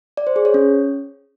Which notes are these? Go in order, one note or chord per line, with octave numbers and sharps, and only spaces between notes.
D5
C5
G#4
C#5
C#4